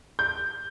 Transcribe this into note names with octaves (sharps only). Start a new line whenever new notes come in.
G6